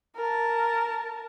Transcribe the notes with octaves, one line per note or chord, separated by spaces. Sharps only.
A#4 A5